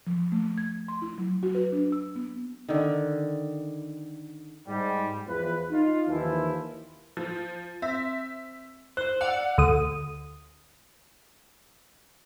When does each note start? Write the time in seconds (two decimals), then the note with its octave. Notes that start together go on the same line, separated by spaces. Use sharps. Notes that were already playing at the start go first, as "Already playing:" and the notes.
0.07 F3
0.32 A3
0.58 G#6
0.88 C6
1.02 E4
1.18 F#3
1.43 F#4
1.55 B4
1.72 D4
1.92 E6
2.16 B3
2.68 D3 D#3
4.67 G#2 G3
5.27 E2 F3 B4
5.71 D#4 F4
6.08 D#2 E3 F3 E4
7.17 F3
7.82 C4 E5
8.97 C5 F#6
9.21 D5 F5 F#5 E6
9.58 D2 D#6